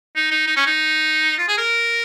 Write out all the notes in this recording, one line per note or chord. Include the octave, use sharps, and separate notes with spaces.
D#4
D#4
D#4
C#4
D#4
F4
G#4
A#4